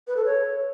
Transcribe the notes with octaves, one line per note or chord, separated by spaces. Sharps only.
B4
A4
C#5